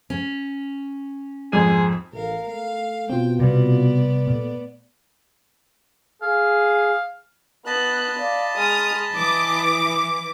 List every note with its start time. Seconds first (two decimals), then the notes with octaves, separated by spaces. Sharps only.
0.10 C#4
1.52 F2 G#2 G#4 D#7
2.13 A1 A#4 F5
2.48 A3 F5
3.10 B2 C4 F4 G5
3.39 C3 G3 B3 D5
4.27 A#2 A3
6.22 G#4 F5
7.66 B3 D#5 A5 B5 F#6
8.18 D5 F5
8.58 G#3 D#6 F6
9.13 E3 D6 D#6